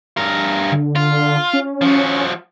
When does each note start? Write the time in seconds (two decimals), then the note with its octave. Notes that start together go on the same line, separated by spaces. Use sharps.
0.17 G2 A#4
0.72 D3
0.96 F4
1.53 C#4
1.81 F3 F#4